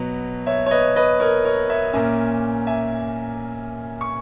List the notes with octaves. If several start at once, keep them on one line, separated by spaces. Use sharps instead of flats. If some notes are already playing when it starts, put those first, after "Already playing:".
Already playing: B2 F#3 B3
C#5 E5
C#5
B4 D#5
B4 D#5
A#4 C#5
A#4 C#5
C#5 E5
A#2 A#3 C#4 E5 G#5
E5 G#5
C#6